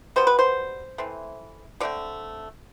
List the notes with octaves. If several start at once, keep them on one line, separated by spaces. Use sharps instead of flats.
B2 G3 B3 C5
B4
C5
E3 A3 C4
D3 A3 C4 D5